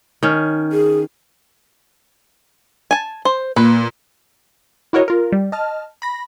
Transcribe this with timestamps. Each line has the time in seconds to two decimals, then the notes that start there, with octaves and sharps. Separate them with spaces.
0.23 D#3 C#4
0.72 G#4
2.91 G#5 A5
3.25 C5
3.56 A#2 B4
4.93 E4 F#4 A#4 C#5 D#5
5.08 F4 A#4
5.32 G3
5.52 D#5 A5 F6
6.02 B5 A#6